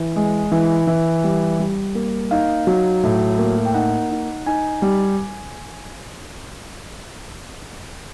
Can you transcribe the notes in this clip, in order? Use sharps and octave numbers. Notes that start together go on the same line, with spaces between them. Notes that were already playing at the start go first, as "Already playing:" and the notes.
Already playing: E3
G#3
E3
E3
G3
G3
A#3
D#4 F5
F#3
A2
A#3
G5
D#4 F#5
D#4
D#4 G#5
G3